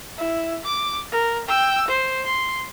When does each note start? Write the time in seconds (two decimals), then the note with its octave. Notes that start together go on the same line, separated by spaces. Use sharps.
0.18 E4
0.65 D6
1.12 A#4
1.48 G5 E6
1.88 C5
2.25 C6